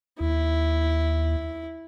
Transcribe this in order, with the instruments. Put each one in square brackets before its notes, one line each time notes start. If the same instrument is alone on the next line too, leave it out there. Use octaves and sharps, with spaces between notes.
[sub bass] D#2 [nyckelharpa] E4